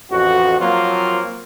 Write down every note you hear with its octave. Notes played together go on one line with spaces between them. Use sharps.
A1 F2 F#4
F3 F#3 A#3 C4 F4